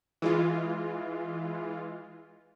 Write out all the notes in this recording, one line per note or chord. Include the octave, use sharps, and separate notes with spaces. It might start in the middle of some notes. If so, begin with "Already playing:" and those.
E3 G#3 F4